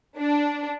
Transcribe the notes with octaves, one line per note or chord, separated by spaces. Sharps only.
D4